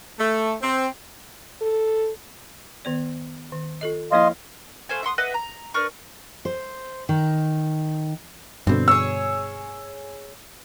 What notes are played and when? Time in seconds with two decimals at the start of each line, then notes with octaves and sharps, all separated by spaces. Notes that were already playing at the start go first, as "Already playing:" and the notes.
0.19 A3
0.61 C4
1.61 A4
2.85 D#3 B3 D5
3.52 D#3
3.81 F4 A4 D#5
4.12 F3 A#3 E4 D#5 F5 C6
4.89 A3 F4 C5 G#5
5.03 E5 F#5 C6 D#6
5.18 B4 D#5 E5 F#5
5.34 A#5
5.74 D4 A#4 B4 C#6
6.45 C5
7.09 D#3
8.67 G2 B2 D3 C4
8.88 G#4 C#5 E6